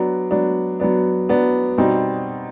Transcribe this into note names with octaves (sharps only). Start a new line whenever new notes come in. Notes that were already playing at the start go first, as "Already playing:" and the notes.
Already playing: F#3 B3 D4
F#3 B3 D4
F#3 B3 D4
F#3 B3 D4
B2 G3 C4 D#4